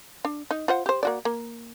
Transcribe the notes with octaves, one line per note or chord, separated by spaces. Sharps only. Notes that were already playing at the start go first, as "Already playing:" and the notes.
D4
D#4
F4 C5 F#5
G4 C5
A#3 F#4 D5
A#3